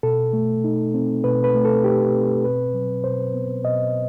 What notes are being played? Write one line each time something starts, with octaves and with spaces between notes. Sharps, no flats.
B2 A4
A3
D#4
C4
B2 B4
B4
A3
A4
D#4 G4
C4
B2 B4
F#3
B2 C5
B3
B2 D#5